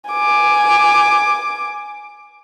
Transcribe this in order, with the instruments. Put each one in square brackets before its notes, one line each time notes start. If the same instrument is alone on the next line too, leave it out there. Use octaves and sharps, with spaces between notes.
[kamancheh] G#5 D6